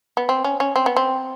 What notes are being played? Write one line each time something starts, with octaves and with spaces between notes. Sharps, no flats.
B3
C4
C#4
C#4
C4
B3
C4